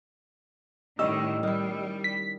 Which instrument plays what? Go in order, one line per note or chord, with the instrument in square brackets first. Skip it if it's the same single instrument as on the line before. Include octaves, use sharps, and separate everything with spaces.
[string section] A2 D#3 [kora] G3 C#4 [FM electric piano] D#5 E6
[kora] D#3 E4 [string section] G3
[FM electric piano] B6